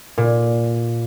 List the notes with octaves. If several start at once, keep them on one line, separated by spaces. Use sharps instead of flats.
A#2